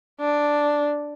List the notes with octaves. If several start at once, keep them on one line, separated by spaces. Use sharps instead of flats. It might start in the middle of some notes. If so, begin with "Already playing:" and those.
D4